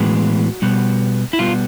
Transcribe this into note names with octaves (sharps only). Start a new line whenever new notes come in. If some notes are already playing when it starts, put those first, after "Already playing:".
Already playing: A2 E3 G#3 B3 F#4
B2 G3 B3
E4
B2 G3 B3 F4